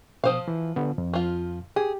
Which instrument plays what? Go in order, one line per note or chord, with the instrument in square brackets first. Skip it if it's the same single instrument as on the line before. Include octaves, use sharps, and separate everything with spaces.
[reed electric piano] B2 D#6 [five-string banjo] F3 C5 F5
[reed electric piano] E3
D3 B3
F2
[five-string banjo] F3 F4
[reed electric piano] G4 [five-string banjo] G#4